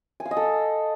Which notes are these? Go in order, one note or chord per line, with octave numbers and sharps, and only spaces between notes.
G#5
F5
D#5
A4